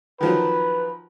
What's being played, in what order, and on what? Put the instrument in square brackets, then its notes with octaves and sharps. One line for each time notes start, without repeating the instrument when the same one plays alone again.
[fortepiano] D#3 F3 F#3 [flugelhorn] B4